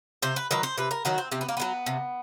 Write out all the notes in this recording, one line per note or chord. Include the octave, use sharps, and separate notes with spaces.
C3 C5
B4
D#3 F#3 B4
C5
C3 B4
A#4
D#3 F#3 F#4
C4
C3 C4
B3
A#3
D#3 F#3 B3
C3